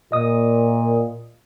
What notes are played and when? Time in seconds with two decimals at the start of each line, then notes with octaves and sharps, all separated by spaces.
0.12 A#2 D#5 D#6